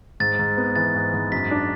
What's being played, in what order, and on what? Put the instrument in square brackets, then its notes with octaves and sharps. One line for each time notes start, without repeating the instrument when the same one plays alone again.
[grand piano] G#2 [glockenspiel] A6
[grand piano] G#2
B3
[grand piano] E3 [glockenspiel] A6
[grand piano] G#2
G#2
[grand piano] F#2 [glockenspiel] B6
[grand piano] D4